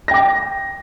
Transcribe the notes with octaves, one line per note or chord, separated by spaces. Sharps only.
G5 D6 A#6